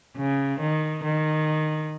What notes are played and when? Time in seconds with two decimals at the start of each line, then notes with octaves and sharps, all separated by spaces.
0.16 C#3
0.60 D#3
1.03 D#3